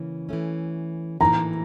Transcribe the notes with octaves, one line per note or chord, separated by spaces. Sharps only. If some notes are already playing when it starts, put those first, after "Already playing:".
Already playing: C#3 E3 A#3
E3 A3 C#4
A2 E3 A#3 A#5